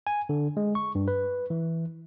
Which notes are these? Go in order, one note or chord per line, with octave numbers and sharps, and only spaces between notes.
G#5
D3
G#3
C#6
G2
B4
E3